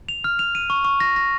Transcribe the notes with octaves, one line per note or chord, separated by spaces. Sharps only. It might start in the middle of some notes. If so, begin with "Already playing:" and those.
F7
F6
F7
D#7
C#6
C#6
A#6
A#6